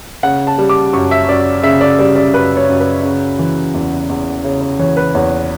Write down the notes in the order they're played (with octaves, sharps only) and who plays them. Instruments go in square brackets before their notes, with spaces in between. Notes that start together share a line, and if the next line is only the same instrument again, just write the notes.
[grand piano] C#3 F#5
A5
G3
D6
F#2 C#6
E5
F#2 D5
C#3 E5
D5
G3 D5
D5
F#2 B4
C#5
F#2
B4
C#3
E3
E2
E2
C#3 C#5
C#5
E3 C#5
B4
E2 C#5